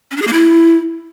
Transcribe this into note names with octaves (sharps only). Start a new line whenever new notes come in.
C#4
D4
G#4
A#3
E4